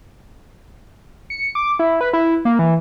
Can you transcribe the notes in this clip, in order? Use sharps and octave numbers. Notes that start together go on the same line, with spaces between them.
C#7
D6
E4
B4
E4
A#3
E3